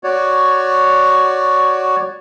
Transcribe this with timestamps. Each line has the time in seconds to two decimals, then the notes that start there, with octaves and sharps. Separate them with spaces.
0.04 F#4 C#5 D5